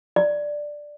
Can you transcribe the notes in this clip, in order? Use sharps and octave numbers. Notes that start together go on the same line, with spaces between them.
D5